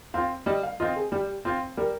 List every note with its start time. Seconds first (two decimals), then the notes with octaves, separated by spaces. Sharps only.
0.14 C4 F4 F5
0.46 G3 D#5
0.63 F5
0.80 C4 F4 D#5
0.96 G#4
1.12 G3 G4
1.45 C4 F4
1.77 G3 A#4